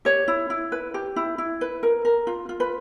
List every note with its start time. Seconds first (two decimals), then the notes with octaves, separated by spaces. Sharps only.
0.05 G4 C#5
0.28 E4
0.50 E4
0.72 B4
0.94 G4
1.16 E4
1.38 E4
1.61 B4
1.83 A#4
2.05 A#4
2.27 F4
2.49 F4
2.60 B4